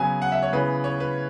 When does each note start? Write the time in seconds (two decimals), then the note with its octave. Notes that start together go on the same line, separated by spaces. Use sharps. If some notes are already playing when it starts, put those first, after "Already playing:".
Already playing: C#3 F#3 B3 G#5
0.22 F#5
0.32 E5
0.42 C#5
0.53 C#3 E3 B3 B4
0.84 C#5
1.00 B4